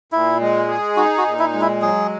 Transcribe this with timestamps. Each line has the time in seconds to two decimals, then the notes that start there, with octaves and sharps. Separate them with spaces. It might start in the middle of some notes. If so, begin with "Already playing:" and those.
0.12 A#2 E4
0.40 G#3
0.68 G#4
0.97 D#4 F#4
1.18 F#4
1.25 A#2
1.39 E4
1.53 G#3
1.61 E4
1.81 F#3 G#4